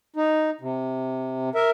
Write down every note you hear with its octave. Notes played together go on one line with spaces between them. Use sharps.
D#4
C3
A#4 E5